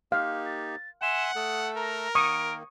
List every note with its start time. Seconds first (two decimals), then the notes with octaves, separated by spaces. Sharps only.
0.12 A#3 D#4 G4 F5
0.46 A6
1.02 E5 F#5 G#5 C6 E7
1.36 A3 A4 D#6
1.77 A#4 A#5
2.15 D#3 A#3 C#6 D#6 D7